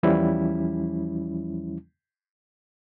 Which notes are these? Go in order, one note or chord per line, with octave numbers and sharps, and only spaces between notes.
E2 E3 F3 G3 C#4 E4